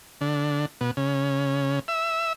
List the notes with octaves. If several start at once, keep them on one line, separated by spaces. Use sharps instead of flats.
D3
B2
C#3
E5